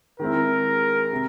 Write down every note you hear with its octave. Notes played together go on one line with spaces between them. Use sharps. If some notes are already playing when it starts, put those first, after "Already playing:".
D#3 G#3 C4 E4 A#4
C3